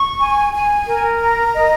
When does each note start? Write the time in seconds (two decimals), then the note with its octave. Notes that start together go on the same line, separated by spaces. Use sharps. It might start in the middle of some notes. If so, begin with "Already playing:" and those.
Already playing: C#6
0.19 G#5
0.54 G#5
0.87 A#4
1.20 A#5
1.55 D#5